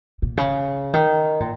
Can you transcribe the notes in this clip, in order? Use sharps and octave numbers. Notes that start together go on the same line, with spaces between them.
A#2
C#3
D#3
A#2